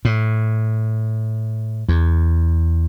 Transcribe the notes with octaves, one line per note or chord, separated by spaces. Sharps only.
A2
E2